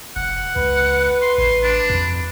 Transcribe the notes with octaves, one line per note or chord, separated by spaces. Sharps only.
F1 F#5
C#2 B4
C6
A1 C6
D4
F2